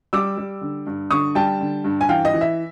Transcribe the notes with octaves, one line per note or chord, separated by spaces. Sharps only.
G3 D6 E6
G3
D3
G2
D3 C#6 D#6
G3 G5 A5
D3
G2
G#5
E3 F5 G5
D#5
E3
E5